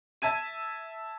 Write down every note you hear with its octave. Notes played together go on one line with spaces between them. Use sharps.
E5 A5 G#6 D#7